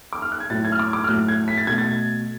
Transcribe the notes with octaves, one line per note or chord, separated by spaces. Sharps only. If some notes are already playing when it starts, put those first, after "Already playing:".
D6
F6
F#6
G#6
A2 F#3 A3 A6
G#6
F6
D6
D6
F6
A2 F#3 A3 F#6
G#6
B6
A6
B2 A3 G#6
A6